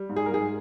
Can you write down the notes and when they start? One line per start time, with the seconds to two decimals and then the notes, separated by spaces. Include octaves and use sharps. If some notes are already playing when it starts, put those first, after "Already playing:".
Already playing: G3
0.09 G#2
0.16 G#4
0.26 A#4
0.31 G#2 G#4